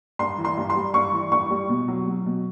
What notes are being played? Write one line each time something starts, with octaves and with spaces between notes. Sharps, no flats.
G2 C6
E3
C6
G2
C6
G3
G2 C#6
E3
G2 C#6
G3
B2
F#3
F#3
B2